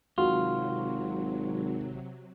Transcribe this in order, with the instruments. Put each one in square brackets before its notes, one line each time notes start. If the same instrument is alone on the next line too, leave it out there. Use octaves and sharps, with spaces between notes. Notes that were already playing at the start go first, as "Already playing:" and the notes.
[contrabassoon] G#1 [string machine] C3 F#3 [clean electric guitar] F4 [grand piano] F#4